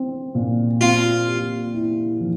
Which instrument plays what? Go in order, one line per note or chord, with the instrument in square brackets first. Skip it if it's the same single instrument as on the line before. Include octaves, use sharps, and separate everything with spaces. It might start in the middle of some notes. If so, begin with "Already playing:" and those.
Already playing: [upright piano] C4
A#2
[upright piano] C4 [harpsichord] F4
[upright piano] G4
E4
F3